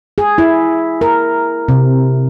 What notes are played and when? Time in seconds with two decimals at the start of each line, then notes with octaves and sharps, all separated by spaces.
0.18 G#4
0.38 E4
1.01 A#4
1.69 C3